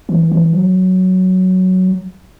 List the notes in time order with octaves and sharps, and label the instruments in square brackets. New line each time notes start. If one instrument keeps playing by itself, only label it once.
[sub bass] E3
E3
F#3